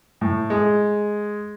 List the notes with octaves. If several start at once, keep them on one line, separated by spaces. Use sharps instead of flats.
A2
G#3